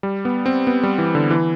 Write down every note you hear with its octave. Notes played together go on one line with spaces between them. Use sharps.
G3
B3
C4
B3
G3
E3
D3
E3